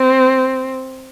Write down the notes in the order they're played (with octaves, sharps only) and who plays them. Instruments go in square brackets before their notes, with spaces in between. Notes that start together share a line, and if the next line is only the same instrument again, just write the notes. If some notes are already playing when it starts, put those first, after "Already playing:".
Already playing: [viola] C4